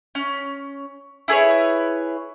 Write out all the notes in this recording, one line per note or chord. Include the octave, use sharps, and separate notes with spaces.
C#4
E4 G#4 B4 C#5